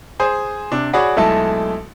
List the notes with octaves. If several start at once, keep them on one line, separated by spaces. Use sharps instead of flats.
G#4 C5 G#5
C3 D4
F#4 G#4 C#5 D5 F#5 B5
B1 G#3 A3 E4 A5